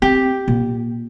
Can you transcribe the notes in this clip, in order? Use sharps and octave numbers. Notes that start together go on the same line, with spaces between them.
C4 G4
A#2